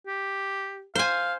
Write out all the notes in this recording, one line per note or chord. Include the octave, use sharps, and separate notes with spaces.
G4
C5 F5 G#5